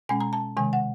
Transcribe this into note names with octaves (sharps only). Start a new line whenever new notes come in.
B2 G#3 C#4 G#5
A#5
A5
C3 D#3 G#3 G#5
F#5